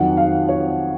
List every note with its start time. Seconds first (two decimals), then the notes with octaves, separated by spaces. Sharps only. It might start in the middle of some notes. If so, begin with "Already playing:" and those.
Already playing: F2 D#3 F#3 F#5
0.17 F5
0.49 C#5